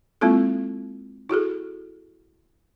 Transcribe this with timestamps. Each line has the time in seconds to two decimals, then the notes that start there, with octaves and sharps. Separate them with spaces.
0.21 G#3 A#3 C4 E4 F4 A4
1.29 E4 F#4 G#4 A4